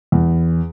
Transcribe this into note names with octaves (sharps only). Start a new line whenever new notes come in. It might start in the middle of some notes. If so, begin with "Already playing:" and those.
E2